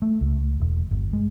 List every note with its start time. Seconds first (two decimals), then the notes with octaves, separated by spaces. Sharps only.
0.02 A3
0.21 C#2
0.60 E1
0.91 G1
1.13 G#3